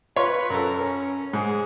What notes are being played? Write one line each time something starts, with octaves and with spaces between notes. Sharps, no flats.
F4 B4 C#5 C6
F#2 A4 A#4
C#4
G#2 G#4